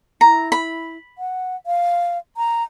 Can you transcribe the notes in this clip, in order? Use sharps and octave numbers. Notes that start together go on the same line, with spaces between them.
E4 A#5
B5
F#5
F5
A#5